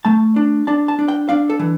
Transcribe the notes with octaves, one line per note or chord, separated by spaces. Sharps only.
A3 A5
D4
D4 A5
A5
D4
G5
D4 F5
A4
E3